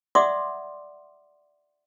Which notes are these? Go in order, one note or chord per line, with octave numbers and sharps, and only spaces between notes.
D5 E5 F#5 C6 D6 D#6